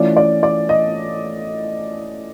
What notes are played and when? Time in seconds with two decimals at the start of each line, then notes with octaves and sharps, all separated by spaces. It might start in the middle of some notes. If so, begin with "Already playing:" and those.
Already playing: E3 A3 C#4 F4 D5
0.17 D5
0.43 D5
0.69 D#5